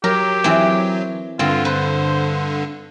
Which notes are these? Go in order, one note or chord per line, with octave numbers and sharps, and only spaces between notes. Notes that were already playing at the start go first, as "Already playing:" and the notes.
F#3 G4 A#4
E3 C4
G2 D3 C4 F4
B4 C5